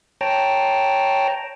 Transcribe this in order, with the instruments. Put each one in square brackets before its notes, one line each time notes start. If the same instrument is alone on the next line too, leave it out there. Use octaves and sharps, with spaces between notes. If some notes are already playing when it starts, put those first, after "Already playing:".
[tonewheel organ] C#5 G5 A5 A#5